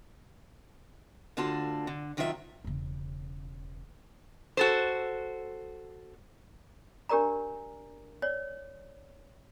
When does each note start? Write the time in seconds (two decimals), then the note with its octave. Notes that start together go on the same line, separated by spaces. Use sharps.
1.37 D2 D3 F4 F#4 A5
1.87 D3
2.17 F2 D#3 F#3 F4 A4 E5
2.65 E1 C#3
4.57 F#4 A4 C5
7.09 D4 G4 A#4 D5 A#5
8.22 C#5 D5